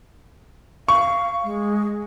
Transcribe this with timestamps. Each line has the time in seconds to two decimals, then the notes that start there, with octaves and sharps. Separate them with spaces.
0.88 F5 C#6
1.44 G#3